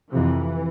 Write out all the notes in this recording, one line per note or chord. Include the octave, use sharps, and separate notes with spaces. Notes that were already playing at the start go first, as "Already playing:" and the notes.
F2 C3 E3